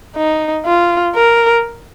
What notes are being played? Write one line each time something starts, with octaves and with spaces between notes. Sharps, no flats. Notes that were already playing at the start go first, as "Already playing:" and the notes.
D#4
F4
A#4